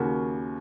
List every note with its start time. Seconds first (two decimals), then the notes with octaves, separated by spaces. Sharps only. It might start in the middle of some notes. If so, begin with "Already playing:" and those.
Already playing: D#2 C#3 A#3 F#4 A#4